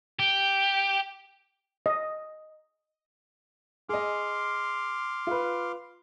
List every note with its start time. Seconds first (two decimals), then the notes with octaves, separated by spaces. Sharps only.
0.19 G4
1.86 D#5
3.89 G#4 D#5 C6 D6 F6
5.27 F4 B4